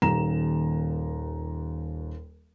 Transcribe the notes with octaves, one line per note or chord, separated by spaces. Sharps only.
D#1 D#2 A#5 E7